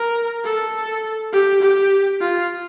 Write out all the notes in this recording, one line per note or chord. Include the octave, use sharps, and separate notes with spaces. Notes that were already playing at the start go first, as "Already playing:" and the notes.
Already playing: A#4
A4
G4
G4
F4